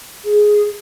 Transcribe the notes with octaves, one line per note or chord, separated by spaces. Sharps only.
G#4